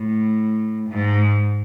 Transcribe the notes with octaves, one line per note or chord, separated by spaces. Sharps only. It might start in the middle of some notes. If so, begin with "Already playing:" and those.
Already playing: A2
G#2